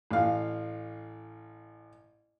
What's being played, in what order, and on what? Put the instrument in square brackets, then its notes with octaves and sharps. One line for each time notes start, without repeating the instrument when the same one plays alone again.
[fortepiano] A1 F5